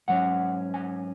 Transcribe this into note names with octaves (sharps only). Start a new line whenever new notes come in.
G#2 F#3 C#4 F#5
G#5